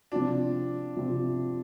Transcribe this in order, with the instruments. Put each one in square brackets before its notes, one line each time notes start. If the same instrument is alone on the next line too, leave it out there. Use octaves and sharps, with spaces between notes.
[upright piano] C3 F3 C4 F4 [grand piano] D4
[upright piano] C3 F3 C4 F4